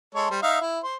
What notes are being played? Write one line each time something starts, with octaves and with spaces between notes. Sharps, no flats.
G#3 A4 C#5
G3 C5
D#4 E5 F5
E4
C5